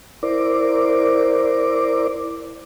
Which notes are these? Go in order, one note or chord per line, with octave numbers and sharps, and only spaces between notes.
E4 A#4 C5 D5 D6